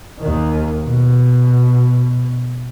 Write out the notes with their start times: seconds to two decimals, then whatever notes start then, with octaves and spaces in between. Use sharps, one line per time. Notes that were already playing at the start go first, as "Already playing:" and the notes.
0.20 D#2 D#3
0.87 B2